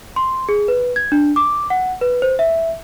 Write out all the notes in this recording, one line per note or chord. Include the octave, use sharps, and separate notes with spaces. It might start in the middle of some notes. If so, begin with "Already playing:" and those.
C6
G#4
B4
G#6
D4
D6
F#5
B4
C5
E5